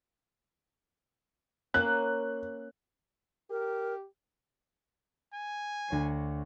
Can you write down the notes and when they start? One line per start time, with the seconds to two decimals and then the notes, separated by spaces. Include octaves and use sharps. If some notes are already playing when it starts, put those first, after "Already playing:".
1.74 A#3 C#4 F#6
3.50 G4 A#4
5.34 G#5
5.88 D2 C#5 C7